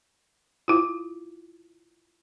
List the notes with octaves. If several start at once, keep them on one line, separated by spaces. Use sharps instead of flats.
E4 F4